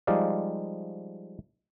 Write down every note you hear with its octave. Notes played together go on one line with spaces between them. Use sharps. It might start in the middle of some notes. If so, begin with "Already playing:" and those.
F3 G3 G#3 D#4 D5 F5